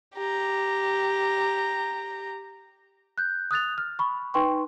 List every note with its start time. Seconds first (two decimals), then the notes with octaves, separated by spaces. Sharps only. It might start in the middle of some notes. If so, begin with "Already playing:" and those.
0.16 G4 A#5
3.18 F#6 G6
3.51 D#6 F#6 A6 F7
3.78 F6
3.99 B5 C#6
4.34 D#4 B4 G5 C6 C#6